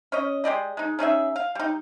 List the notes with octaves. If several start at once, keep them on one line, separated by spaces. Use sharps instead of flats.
C#4 C#5 D#5
G#3 G4 D5 D#5
G#3 D#4
C#4 D#4 G#4 E5
F5
G3 D#4